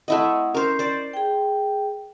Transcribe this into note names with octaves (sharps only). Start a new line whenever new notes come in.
A3 C4 E4 D#5 F#5
C#4 A#4 C5
C5 D5
G#4 G5